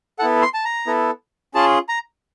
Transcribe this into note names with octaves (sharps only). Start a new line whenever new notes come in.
B3 E4 A4 F#5
C6
A5
A#5
B3 E4 A4
C#4 F4 G#4 A5
A#5